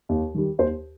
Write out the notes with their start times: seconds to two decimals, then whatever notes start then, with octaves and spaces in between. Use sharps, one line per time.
0.09 D#2
0.34 D#3 G3
0.58 D#2 C5